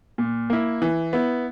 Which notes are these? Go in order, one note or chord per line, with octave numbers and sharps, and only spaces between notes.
A#2
A#3 E4
E3
B3 E4